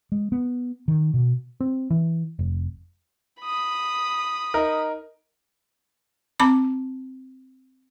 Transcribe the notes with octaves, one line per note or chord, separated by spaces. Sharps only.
G#3
B3
D#3
B2
C4
E3
F1
B5 D#6
D#4 A#4
C4 A5 B5 D6